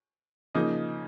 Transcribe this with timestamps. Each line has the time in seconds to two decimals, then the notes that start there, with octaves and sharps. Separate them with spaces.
0.55 C#3 F3 A#3 D#4 D#5